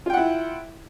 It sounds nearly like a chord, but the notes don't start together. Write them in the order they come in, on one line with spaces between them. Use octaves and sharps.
F4 G5 F#5 E4